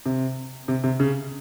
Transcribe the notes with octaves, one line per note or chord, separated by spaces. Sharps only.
C3
C3
C3
C#3